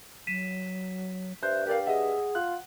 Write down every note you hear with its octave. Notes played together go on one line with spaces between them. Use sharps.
F#3 B6 D#7 E7
G2 C5 E5 F#6 G6
G4 A#4 D5 F5
G#4 D#5 E5 F#5
F4 F#6